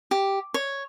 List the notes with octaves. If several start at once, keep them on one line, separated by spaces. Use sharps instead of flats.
G4
C#5